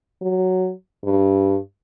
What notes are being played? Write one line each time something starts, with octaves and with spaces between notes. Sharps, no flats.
F#3
G2